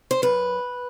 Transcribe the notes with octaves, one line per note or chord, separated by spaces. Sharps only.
C5
F#2 B4